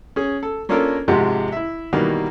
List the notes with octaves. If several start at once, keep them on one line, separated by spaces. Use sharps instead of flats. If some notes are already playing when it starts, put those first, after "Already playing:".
C#4 G#4
A4
A#3 C#4 D4 F4 A4 A#4
G#2 C3 F3 G#3 F#4 G4
E4 E5
B2 D#3 E3 G3 A#3 F#4